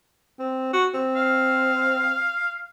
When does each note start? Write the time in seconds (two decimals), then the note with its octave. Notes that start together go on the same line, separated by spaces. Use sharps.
0.39 C4
0.73 F#4
0.94 C4
1.16 F5